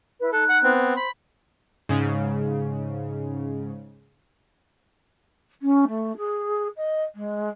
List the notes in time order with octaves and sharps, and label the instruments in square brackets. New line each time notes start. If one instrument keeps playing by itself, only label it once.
[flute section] E4 B4
[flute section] D#4 F#6 [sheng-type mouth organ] A4
[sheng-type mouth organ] F#5
B3 C4
[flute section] C5
[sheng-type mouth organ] B5
[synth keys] G#2 C#3
[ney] C#4
A3
G#4
D#5
G#3